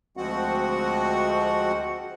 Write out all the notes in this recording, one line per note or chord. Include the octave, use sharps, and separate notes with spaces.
D2 F3 G#3 C4 F#4 F#5